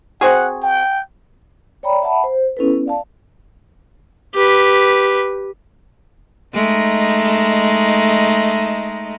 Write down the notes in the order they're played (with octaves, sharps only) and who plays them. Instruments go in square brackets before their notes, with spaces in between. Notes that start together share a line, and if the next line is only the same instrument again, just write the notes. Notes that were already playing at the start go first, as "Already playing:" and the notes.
[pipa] C4 F#4 G#4 [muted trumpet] F#5
[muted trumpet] G5
[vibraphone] C#5 D5 G5 A#5 B5
E5 F#5 A5 B5
C5
B3 C#4 E4 A4 B4
D5 F5 A5
[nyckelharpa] G4 B4
[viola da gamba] G#3 A3 D#4